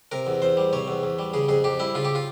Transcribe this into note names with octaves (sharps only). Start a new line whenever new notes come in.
C3 A#4
E2
E2 C5
G3
C3 C#5
E2
E2
G3
C#3 G#4
F2 G#4
F2 G4
G3 E4
C#3 F4
G4
F4